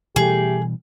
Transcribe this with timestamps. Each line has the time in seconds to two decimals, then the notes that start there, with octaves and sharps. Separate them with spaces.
0.16 B2 E3 G3 A3 G4 G#4